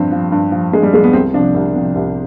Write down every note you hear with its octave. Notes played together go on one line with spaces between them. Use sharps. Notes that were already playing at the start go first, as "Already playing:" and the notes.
Already playing: G2 F3 C4
F3
G2
F3
G2 G#3
G3
F3 G#3
B3
C2 C4
C3 F3 D4
C2
C3 F3
C2